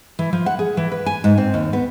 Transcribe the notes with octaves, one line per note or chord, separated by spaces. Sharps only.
E3
F3
F#5
G#4
E3
B4
G#5
G#2
C4
D#2
B3